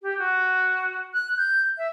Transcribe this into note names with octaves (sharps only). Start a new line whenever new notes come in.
G4
F#4
F#6
G6
E5